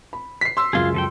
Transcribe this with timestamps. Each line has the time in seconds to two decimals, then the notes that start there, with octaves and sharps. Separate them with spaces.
0.13 B5
0.41 B6 C7
0.57 C6 E6
0.73 C#2 F#2 G#3 F4 G#4
0.94 F3 A4 G5